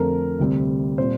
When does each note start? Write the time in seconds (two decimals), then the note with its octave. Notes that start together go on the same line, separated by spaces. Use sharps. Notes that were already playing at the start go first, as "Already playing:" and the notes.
Already playing: F2 D3 F3 A3 C4 A#4
0.39 D2 C3 G3 C4
0.98 A#2 G3 C4 C5